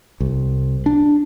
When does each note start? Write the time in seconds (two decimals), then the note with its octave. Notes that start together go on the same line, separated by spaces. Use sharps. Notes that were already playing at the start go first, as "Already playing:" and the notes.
0.20 C2
0.86 D4